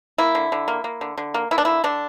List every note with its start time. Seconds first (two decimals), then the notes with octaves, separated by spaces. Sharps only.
0.18 A#3 E4
0.35 D3
0.52 D3
0.68 A#3
0.84 A#3
1.01 D3
1.18 D3
1.34 A#3
1.51 A#3 E4
1.58 D4
1.65 D3 E4
1.84 D3 D4